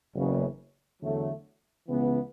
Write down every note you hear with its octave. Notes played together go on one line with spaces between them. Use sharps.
F#1 E2 C#3
E2 D3 F#3 A3
C#2 C#3 E3 B3